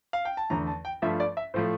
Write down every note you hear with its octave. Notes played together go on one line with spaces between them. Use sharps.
F5
G5
A5
E2 D3 A3 A#5
A5
G5
G2 F3 A3 E5
D5
E5
A2 F3 A3 C5